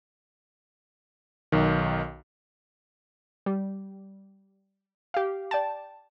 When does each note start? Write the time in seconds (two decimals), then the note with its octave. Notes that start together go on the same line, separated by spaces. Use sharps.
1.52 B1 D#3
3.46 G3
5.14 G4 F5
5.51 D5 G5 A5